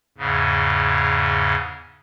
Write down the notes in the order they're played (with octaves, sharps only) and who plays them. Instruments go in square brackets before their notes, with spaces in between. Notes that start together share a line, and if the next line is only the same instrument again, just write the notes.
[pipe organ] E2 G#2 C#3